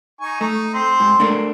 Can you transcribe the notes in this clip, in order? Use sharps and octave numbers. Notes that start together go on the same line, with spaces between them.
D#4 G#5 C#6
A3 D#4
C4 C6
G#2
A3 A#3 D4